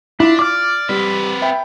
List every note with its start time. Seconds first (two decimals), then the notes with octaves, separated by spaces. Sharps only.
0.20 D4 E4 F4
0.39 D5 D6 F6
0.89 G3 C4 B4
1.42 E5 G5 B5